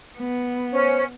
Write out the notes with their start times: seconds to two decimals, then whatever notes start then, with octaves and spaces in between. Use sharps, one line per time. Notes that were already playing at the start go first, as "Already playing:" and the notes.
0.19 B3
0.72 C#4 C5